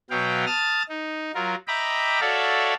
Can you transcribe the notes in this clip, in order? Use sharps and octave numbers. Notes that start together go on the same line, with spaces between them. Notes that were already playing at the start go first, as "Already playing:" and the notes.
B2 F#3 B3 F5 G5
A5 D#6 F6 A6
D#4
F#3 F4 A#4
D#5 E5 G5 A#5 B5 D6
F#4 A4 C#5 D5 E5 F5